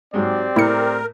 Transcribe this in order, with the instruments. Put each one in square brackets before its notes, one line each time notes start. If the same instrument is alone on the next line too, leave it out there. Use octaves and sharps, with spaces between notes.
[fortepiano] G#2 F#3 G#3 [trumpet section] C4 G4 D5
[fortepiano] A2 [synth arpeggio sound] E4 C#7 [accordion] A#4